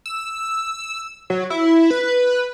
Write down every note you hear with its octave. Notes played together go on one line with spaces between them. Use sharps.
E6
F#3
E4
B4